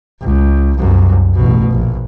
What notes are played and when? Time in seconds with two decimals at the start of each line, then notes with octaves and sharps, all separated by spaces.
0.22 C#2
0.78 C2 F#2
1.35 A1 B2
1.71 A#1